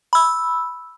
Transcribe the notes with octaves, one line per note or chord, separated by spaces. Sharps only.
B5 E6